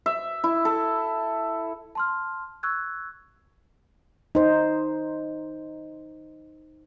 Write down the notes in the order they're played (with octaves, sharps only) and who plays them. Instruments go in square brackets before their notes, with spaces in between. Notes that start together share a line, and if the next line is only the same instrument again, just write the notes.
[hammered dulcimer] E5
E4
A4
[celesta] A5 C6 F6
C#6 E6 F#6 G#6
[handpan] D#4 C5